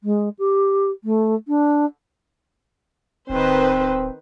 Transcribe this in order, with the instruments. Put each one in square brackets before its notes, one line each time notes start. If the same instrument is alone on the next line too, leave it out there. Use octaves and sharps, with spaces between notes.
[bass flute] G#3
G4
A3
D4
[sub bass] D1 [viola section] D#3 B4 C5 [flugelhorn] C4